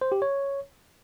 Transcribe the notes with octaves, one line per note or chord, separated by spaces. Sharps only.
C5
G4
C#5